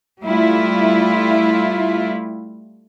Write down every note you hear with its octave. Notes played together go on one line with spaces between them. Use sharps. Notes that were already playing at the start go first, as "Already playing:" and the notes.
G3 A3 E4 F4